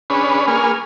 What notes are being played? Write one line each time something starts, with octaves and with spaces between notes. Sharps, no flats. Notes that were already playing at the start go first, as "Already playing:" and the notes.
C#4 D4 G#4 B4 C#5 B5
A#3 G#4 B4 G#5 C#6 F6